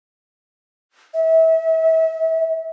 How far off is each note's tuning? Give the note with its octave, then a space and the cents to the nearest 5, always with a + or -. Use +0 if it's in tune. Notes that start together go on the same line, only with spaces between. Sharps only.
E5 -35